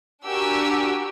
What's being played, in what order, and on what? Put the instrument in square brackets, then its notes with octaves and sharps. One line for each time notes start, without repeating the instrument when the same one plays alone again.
[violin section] D4 F#4 G4 A#4 G#5 E6